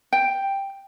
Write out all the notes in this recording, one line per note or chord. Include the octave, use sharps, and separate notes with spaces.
G5